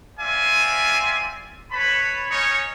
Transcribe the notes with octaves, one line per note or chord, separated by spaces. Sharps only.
C4 F4 D5 E5 G#5
B4 C#5 A5 B5
C#4 D#4 C#5